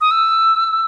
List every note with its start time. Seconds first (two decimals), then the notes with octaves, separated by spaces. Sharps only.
0.01 D#6
0.11 E6